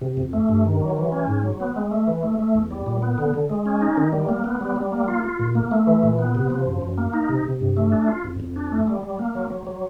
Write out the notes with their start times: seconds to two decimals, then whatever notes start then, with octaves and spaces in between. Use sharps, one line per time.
0.01 C3
0.17 F2
0.33 A3
0.49 G2
0.65 D#3
0.81 F#3
0.97 E3
1.12 C#4
1.28 G#2
1.44 F#3
1.60 B3
1.76 G#3
1.91 A3
2.07 E3
2.23 A3
2.39 A3
2.55 E2
2.71 G3
2.86 A#2
3.02 B3
3.18 D3
3.34 D3
3.50 G#3
3.66 C#4
3.81 D#4
3.97 D#3
4.13 G3
4.29 A#3
4.44 B3
4.61 G3
4.76 G3
4.92 A#3
5.08 F4
5.24 F4
5.39 A#2
5.55 A#3
5.71 A3
5.87 E3
6.03 A#2
6.19 B3
6.35 C3
6.50 F3
6.66 F#2
6.82 F#2
6.98 A#3
7.13 D#4
7.29 C3
7.45 C3
7.61 G2
7.77 A3
7.92 D4
8.08 F4
8.24 F2
8.40 F2
8.56 D4
8.71 A3
8.87 G3
9.03 G3
9.19 A#3
9.35 F#3
9.50 F#3
9.67 F#3